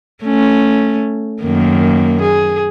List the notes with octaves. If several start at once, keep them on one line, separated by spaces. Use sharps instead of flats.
A3 C#4
F#2 D#3 A#3
G#4